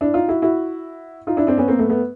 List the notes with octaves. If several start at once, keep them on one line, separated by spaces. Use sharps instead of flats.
D4 E4
D#4 F4
E4 F#4
E4 F#4
D#4 F4
D4 E4
C4 D4
B3 C#4
A#3 C4
A3 B3
A3 B3